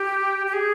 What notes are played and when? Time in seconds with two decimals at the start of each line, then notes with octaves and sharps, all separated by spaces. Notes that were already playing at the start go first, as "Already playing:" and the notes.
Already playing: G4
0.47 G4
0.53 G#4